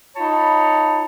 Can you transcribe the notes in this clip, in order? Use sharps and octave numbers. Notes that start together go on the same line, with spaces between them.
D#4 F4 C#5 A5 B5